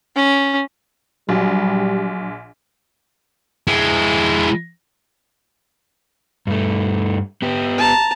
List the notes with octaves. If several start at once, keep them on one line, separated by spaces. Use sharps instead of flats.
C#4
A#1 F#3 G3
G#3 E4
G2 A3
B3 G4
A5 A#5